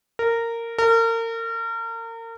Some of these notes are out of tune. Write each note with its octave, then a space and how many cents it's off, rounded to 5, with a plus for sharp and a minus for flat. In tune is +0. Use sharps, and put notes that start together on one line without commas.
A#4 -15
A#4 -35